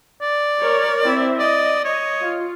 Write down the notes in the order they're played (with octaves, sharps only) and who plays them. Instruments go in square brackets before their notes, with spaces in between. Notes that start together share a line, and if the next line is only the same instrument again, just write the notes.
[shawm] D5
[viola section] A#4 C#5
C4 E4 E5
[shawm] D5 [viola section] D#5
[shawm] C#5 [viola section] D#5
[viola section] F4